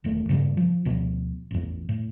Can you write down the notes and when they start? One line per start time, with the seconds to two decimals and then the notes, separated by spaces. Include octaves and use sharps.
0.04 D#1 E2 A3
0.29 G2 A#2 C#3 G3
0.57 F3
0.85 D2 B2 F3
1.51 A1 E2
1.89 A2